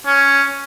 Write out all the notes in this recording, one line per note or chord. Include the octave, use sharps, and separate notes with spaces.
C#4